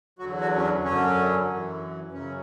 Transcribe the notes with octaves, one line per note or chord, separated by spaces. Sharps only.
E2 D3 F#3 F#4
F#4
C#4
D4
F#2 D3 F#3 C#4
F#2 E3
F#2 C#3 F#3 C#4